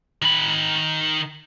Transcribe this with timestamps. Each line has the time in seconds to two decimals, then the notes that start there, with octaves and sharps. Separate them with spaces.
0.22 D#3 B5